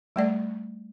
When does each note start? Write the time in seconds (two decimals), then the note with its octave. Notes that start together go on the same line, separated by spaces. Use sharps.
0.16 G3 A3 D5